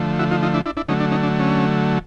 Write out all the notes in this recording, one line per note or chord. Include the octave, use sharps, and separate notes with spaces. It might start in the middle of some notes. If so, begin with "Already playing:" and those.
Already playing: D3 F3 A3
E4 F#4
D#4 F4
D#4 F4
D4 E4
D4 E4
D4 E4
D3 F#3 A3 C#4 D#4
D4
C#4 D#4
D4
C#4